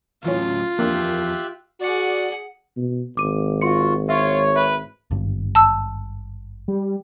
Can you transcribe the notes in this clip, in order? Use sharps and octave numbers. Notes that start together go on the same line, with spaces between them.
A2 E3 F#3 C#4 F4
E2 F3 A#3 D4 G4 E5 F#6
F#4 G#4 D5 F#5
B2
G#1 D6 D#7
F4 F#4 C6 C#7
F4 C#5 E5
B4 E5
G#1 G2
A5 E6
G3